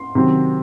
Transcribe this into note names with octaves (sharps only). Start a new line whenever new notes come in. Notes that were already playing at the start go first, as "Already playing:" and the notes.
Already playing: C6
C3 D#3 F#3 C4